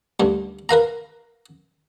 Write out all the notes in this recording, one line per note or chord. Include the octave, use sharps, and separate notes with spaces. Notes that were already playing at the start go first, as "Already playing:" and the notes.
D2 G2
A#4 B4 F5 A#5